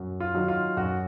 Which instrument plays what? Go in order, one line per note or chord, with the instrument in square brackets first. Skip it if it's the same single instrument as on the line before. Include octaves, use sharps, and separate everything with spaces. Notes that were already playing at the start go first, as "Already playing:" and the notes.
Already playing: [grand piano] F#2
F4
D#3 F#3
F4
F#2 F#4